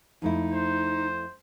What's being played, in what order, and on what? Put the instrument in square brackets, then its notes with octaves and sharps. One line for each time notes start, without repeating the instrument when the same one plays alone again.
[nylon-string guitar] F2 A3 E4 [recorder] D#4
[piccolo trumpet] C5